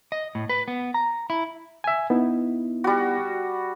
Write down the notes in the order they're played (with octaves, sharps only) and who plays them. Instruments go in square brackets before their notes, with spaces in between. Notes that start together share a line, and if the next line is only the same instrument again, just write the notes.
[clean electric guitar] D#5
A2
B4
B3
A#5
E4
[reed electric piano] E5 G#5
B3 D#4 E4
[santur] G3 F#4